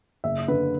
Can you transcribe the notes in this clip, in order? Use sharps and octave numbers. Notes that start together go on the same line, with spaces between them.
F#1 E5
D3 B4